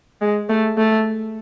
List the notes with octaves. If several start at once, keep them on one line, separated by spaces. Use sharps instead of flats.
G#3
A3
A3